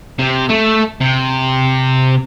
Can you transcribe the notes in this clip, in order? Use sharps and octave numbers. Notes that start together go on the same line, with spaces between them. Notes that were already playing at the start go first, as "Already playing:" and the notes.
C3
A3
C3